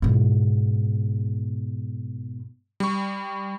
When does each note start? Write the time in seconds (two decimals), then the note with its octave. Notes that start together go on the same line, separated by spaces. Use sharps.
0.02 G#2 B2
2.80 G3 C#6